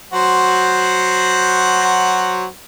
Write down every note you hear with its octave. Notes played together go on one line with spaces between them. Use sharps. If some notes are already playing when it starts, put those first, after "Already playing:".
F#3 F#4 C5